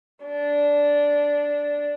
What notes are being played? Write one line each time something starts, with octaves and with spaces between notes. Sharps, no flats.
D4